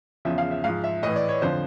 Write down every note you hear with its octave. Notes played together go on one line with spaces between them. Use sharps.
E2 C#3 F3 E5
F5
E5
G#2 F3 F5
E5
A2 E3 D#5
D5
C#5
F2 D3 F3 C5